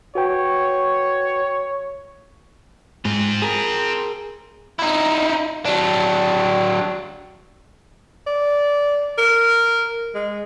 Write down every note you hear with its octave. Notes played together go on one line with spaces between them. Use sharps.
F#4 B4 C#5 G5
G#2 C4 F4
G#4 A#4
D#4 E4
F#3 D4
D5
A#4
G#3